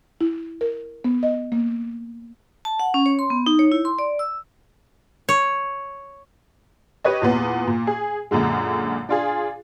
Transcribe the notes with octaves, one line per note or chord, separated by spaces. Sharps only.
E4
A#4
B3
D#5
A#3
A5
F#5
C#4
C#5
C6
B3
D#4
C#5
E4
C6
D5
E6
C#5
G4 B4 C#5 D#5
E2 A#2 B3
A#2
G#4
F#2 A#2 D3 G#3
D4 F4 G#4